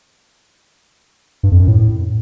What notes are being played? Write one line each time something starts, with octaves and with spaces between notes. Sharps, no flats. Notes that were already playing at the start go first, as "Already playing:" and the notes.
G2
F2
F#2
A2